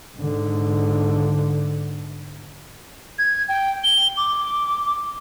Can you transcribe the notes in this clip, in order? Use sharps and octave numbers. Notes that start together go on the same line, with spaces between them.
G#2 D3
G#6
G5
G7
D6